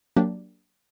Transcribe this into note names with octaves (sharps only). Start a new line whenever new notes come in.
F#3 A#3 D4 G4